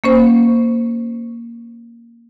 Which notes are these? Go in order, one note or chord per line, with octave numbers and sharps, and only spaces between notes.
A#3 C#4 C5